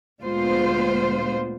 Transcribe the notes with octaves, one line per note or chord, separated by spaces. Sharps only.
D2 A#2 G#3 B3 F4 C5